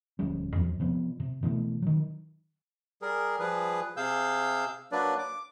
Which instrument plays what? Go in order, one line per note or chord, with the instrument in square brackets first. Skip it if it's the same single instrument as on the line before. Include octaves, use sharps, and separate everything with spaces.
[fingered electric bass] D1 F3 G3 C#4
E2 F3 F#3
C3 F3 B3
C3
B2 E3 G3 A3
D#3 F#3
[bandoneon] G3 G#4 A#4
F3 G3 G#4 B4
C3 G#4 F5 E6 G6
F#3 A#3 D4 B4 D5
D6